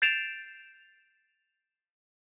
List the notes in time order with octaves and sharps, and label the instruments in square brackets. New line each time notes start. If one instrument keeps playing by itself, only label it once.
[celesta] G6 A6 C7 D7 E7 F7